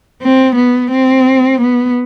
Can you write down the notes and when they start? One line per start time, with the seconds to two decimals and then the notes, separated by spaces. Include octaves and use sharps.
0.21 C4
0.55 B3
0.90 C4
1.60 B3